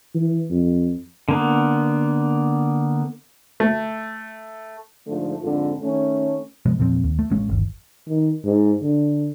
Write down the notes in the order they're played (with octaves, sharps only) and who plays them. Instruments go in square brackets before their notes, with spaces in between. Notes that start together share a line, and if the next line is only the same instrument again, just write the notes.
[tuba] E3
F2
[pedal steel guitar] D3 A#3 B3
[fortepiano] A3
[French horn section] G#2 D3 F3 A3
F2 G#2 D3 F4 A4
D#3 A3 C#4
[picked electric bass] C3 F3 G#3 B3
E2 A#2 F3 C4
D#2
A3
A1 G#3 C#4
G1 D#2
[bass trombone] D#3
G#2
D3